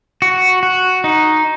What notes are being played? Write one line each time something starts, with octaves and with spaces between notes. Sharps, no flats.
F#4
F#4
D#4